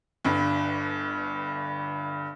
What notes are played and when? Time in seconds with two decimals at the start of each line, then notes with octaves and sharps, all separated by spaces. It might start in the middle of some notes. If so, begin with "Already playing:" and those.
0.25 G1 G2